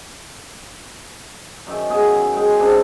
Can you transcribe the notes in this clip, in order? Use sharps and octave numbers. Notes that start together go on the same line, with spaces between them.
F#2 D#3 E5
B2 G#4
G#3 G5
C#3 C4 D4 C5